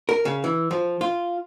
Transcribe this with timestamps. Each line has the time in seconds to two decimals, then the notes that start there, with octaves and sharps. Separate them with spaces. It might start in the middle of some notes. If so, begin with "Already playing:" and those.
0.09 A#4
0.25 C#3
0.44 E3
0.71 F3
1.01 F4